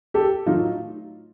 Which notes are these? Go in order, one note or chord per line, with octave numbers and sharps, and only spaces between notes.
G4 A4
A2 F#3 A3 D#4 F4